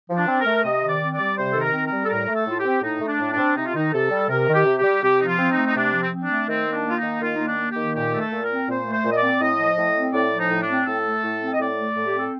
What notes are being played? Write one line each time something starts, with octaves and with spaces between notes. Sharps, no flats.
F3
D4
C4
A#4
A3
C3 D#5
D#3
D5
C4
D5
G3
C3 C5
D#3 A4
A#4
C4
G3 A#4
A4
A2 A#4
A3
A4
A2 F4
G4
C4
A2 D#4
A3
D4
A2
D4
C4
C3 D#4
F4
D#3 D#4
C3 A4
G3
C3 A#4
D#3
G4
C3
G4
G3
C3 G4
F3 D#4
F4
C4
D#4
A3
D#4
C3 D4
F3
C4
C4
D4
A3
D#3 C4
A#3
D4
A#3 F4
D#4
D#3
D#3 F4
D#4
A#3
D4
A#3
G4
D#3
A#2 G4
A3
A4
A#2
A#4
C4
A#2 C5
A3
C5
A#2
D#5
D5
C4
A2 D#5
F3
A2
C4
A2 D5
F3
D#4
A2
D4
C4
A2 A4
A3
A2
C4
D#5
A2 D5
A3
A2
G4
C4 A4